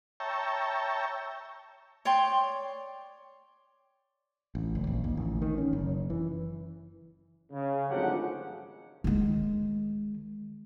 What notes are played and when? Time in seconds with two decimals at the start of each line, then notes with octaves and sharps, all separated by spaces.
0.20 C#5 E5 G5 A5 A#5
2.05 C#5 D5 G5 C6
4.55 A1
4.75 F#1
4.87 A#1
5.04 D#2
5.17 A1
5.42 D#3
5.58 C#4
5.73 F#1
6.10 E3
7.52 C#3
7.90 G#1 D2 F3 F#3 G4 F#5
9.04 D#3 G#3